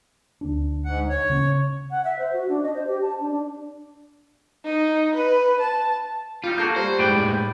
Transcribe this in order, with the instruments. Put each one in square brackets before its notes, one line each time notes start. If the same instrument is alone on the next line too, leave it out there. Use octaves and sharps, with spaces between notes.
[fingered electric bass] D2 D4
[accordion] G#2 F#5
C#5
[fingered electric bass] C#3 C4 C#4
[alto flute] F#5
E5
C5
F#4
D4
D#5
C5
G4
A5
D4
D4
[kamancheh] D#4
B4
A5
[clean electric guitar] G3 D#4 [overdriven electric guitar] F4
[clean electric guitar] A#3 F#4 [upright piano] A4 G6
[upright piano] G3 [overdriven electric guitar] C5
[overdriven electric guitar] A2 G#3 [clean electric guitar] B4 D5 G5